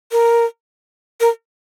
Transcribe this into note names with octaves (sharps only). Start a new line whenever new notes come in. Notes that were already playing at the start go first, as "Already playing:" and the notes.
A#4
A#4